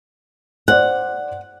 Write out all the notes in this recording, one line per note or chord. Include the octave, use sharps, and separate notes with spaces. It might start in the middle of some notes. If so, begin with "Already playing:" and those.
C5 D5 F#5